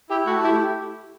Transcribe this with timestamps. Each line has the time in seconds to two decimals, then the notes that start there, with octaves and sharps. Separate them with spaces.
0.10 E4 G4
0.26 A3 F#4
0.43 E4 G4